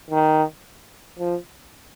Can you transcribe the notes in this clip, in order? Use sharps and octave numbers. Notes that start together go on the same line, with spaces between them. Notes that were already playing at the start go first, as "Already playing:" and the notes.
D#3
F3